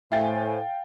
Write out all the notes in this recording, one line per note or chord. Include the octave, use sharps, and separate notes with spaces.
A2 C5 E5 F5 G5 G#5 A6